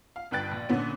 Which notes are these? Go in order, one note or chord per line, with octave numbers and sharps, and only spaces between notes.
F5
G1 G2 B4 G5 F#6 A6
A#1
A#2 D3 B3 C#4